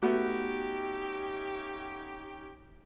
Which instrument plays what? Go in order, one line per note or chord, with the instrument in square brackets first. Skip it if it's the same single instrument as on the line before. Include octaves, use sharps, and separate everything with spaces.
[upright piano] A3 B3 [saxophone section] C#4 D#4 G4 [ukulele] F#4